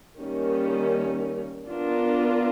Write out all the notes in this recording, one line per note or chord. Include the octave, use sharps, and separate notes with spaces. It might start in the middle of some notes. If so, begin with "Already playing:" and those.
D#3 G3 A#3 C#4
B3 D4 F4 A#4